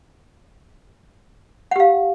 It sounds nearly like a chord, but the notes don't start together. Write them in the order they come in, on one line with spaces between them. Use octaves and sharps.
F#5 G4 F5